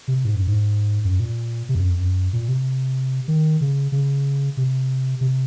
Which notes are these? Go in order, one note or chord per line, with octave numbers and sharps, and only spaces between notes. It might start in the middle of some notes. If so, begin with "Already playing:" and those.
C3
G#2
F#2
G#2
F#2
A#2
C3
F2
F#2
F2
F#2
A#2
C3
D#3
C#3
C#3
C3
C3